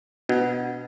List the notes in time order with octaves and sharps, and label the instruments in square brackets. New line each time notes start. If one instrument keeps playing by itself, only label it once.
[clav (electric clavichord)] B2 [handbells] D4 F#4 B4 F#5